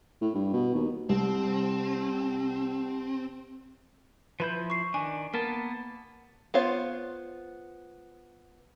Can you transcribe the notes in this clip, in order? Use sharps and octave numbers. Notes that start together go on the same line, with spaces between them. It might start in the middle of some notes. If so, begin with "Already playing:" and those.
A2
G2
B2
D#2
C2 C4
F3 E4 B4 B5 G6
C#6 C7
D#3 D4 G#5
A#3 B3 A#4 A5
B3 F4 C5 C#5 F5